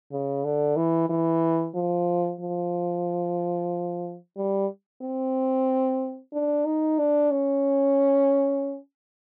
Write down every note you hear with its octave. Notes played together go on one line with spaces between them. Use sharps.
C#3
D3
E3
E3
F3
F3
G3
C4
D4
D#4
D4
C#4